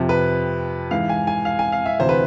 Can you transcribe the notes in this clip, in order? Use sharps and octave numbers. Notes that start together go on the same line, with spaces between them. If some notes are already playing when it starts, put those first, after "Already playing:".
Already playing: F2 C3 F3
B4
G#2 E3 F5
G#5
G#5
F5
G#5
F5
E5
D2 C3 E3 C5
B4